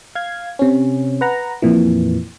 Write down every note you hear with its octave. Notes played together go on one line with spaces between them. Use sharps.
F5 G#6
C3 C#4
B4 F#5 A#5
F2 A#2 E3